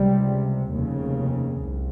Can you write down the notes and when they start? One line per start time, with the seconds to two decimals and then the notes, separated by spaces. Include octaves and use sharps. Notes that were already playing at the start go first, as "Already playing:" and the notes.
Already playing: C#2 C3 G3
0.70 F1 D#2 C#3
1.61 C2